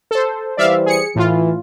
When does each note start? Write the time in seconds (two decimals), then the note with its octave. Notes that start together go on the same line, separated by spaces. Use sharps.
0.11 A4 C5
0.57 E3 G3 C5 D5 E5 F5
0.86 G#4 C#7
1.16 A2 E3 F4